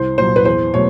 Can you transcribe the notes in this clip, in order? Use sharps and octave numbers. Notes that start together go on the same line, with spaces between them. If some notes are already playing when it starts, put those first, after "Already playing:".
Already playing: C2 C5
A#2 F#3 C5
B4
E2 C5
B2 F#3 A3 C#5